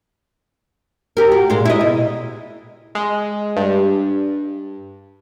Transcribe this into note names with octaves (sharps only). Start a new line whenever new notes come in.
G4 A#4
F#4
A#2 G#3
E4 D#5
B2
G#3
G2